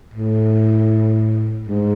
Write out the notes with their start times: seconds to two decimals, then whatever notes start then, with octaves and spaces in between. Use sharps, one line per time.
0.14 A2
1.67 G#2